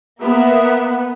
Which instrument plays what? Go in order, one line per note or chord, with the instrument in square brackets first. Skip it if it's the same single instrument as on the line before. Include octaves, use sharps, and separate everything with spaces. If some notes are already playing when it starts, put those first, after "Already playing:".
[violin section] A#3 E5 [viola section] B3